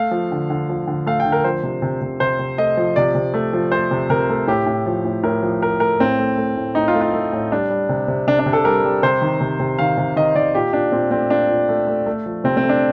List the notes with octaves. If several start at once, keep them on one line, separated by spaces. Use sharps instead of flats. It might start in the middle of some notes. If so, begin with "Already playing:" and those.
Already playing: A3 F5
F3
D3
D3
F3
D3
A3 F5
G5
D3
A#4
F3 C5
C3
C3
C3
C3 C5
C3
A3 D#5
F3
C3 D5
C3
A3
F3
A3 C5
C3
C3 A#4
A3
A2 G4
A2
F3
A2
A2 A#4
F3
F3 A#4
A3 A#4
A2 C4
A3
A3
A2
A2 D#4
F4
A3
F4
A3
A2
G3 D4
G3
C3
C3
C3 D4
D4
C3
A4
G3 A#4
G3
C3 C5
D#3
C3
C3
D#3 F5
C3
D#3 D#5
D#3 D5
A#2 G4
A#2 D4
A#2 C4
A3 C4
A#2 D4
A#2
A3
A3
A3
F3
C3 C4
C4
A3
D4